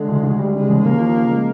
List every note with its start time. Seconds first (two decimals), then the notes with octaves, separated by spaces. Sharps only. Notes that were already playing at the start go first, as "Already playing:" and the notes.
Already playing: D3 G#3
0.08 D2
0.23 D2
0.39 G3
0.54 C#3 G#3
0.69 D#2
0.84 D#2 A#3
1.00 F3
1.16 C#3
1.31 G#3